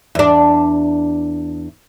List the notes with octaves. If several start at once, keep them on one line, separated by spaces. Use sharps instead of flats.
E2 D4